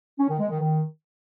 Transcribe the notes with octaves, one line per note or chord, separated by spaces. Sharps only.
C#4
D#3
G#3
D#3
D#3